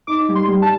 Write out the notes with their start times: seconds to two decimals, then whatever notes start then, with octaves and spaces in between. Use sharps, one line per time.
0.07 D#4 D6
0.29 G3
0.35 C6
0.48 G3
0.62 A5